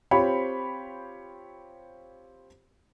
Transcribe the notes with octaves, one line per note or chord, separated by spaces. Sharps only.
C4 F4 G4 C5 C#5 B5